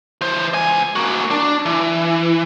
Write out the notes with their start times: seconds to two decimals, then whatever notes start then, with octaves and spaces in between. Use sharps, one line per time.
0.21 E3 C5
0.54 C#2 G#5
0.96 A#3 F#4
1.31 D4
1.66 E3